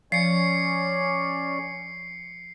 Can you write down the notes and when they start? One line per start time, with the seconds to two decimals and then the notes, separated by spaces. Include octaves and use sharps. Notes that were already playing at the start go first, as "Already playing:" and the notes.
0.12 F3 C#4 C#5 D5 C7 C#7